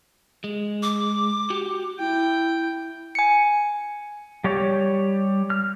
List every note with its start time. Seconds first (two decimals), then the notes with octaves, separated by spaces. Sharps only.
0.44 G#3
0.83 D6
1.50 F#4 G4
1.99 E4 G5
3.15 G#5 C#7
4.44 G3 G4 C#5
5.50 F6